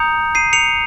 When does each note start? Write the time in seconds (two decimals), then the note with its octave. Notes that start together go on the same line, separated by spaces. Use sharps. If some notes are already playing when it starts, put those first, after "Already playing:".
Already playing: A#5 D#6 G6 C#7 F7
0.35 C7 D#7
0.53 C#7 F7